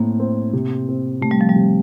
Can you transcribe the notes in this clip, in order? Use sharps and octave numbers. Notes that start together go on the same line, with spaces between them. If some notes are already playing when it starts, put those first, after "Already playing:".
Already playing: A2 A#3 C4
C4
C3
C4
C3 A3
G3
F3
G3
C3